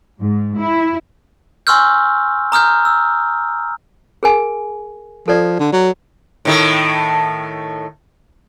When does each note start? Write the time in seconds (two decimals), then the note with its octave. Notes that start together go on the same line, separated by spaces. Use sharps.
0.21 G#2
0.57 E4
1.67 G#5 C6 C#6 E6 F6 G6
2.52 A#5 D#6 F6 G6
2.85 E6
4.23 G#4 A#4 G#5
5.28 F3 A4 D5
5.60 D3
5.73 F#3
6.45 A2 D#3 A3